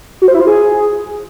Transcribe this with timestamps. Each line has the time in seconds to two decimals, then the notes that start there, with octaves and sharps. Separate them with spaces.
0.22 F#4
0.28 C5
0.34 E4
0.41 F4
0.47 G#4